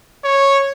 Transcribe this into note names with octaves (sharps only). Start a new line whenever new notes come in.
C#5